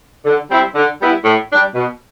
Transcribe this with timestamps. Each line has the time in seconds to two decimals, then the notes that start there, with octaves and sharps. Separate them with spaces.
0.25 D3
0.50 G3 C4 E4
0.75 D3
1.01 G3 B3 E4
1.24 A2
1.50 G3 D4
1.74 B2